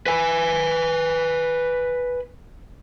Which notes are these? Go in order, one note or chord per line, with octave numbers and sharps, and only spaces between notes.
B4 G#5